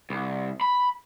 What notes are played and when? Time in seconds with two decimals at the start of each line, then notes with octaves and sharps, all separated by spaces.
0.10 C2
0.61 B5